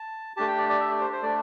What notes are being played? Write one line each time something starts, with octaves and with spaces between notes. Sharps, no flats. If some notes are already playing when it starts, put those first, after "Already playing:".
Already playing: A5
A3 D4 G4 A5
G5
D5
D5
E5
D5
C5
C5
A3 D4 D5